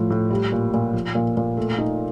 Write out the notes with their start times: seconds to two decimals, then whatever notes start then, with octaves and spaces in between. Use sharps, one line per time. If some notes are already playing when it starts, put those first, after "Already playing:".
Already playing: A2 F3
0.10 A2
0.31 G3
0.52 A#2
0.74 A#2
0.94 F3
1.15 A#2
1.37 A#2
1.57 A3
1.79 D#4